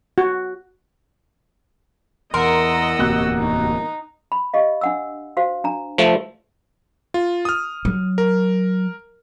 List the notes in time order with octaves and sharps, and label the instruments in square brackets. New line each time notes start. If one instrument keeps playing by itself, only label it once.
[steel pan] F#4
[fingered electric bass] E2 [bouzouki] A#4 [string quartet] D#5 F#5 E6 [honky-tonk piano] C6
[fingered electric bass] D1 E2 A#3 [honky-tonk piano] C3 F#4 F#6
[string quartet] D#4
[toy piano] B5
G4 D#5 F5
D4 F#5 E6
F#4 C5 F5
D4 A#5
[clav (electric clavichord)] F3 A3
[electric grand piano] F4
D#6 F6
[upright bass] F#3
[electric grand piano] A#4